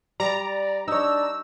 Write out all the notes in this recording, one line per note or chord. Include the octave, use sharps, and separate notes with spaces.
G3 D5 A#5
D4 D#4 C#5 E6